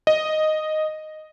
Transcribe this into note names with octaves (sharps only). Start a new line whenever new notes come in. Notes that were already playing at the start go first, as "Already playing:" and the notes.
D#5